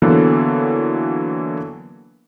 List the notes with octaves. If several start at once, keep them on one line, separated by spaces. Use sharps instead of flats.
D3 E3 F#3 A#3 B3 A4